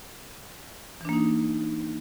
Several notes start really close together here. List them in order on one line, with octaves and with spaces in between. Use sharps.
E3 D4 A#3 D#4